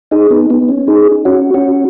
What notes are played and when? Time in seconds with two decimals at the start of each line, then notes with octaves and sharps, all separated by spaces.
0.11 D#4 G#4
0.30 B3 D#4
0.50 B3
0.69 C#4
0.88 D#4 G#4
1.25 C#4 F#4
1.54 C#4 F#4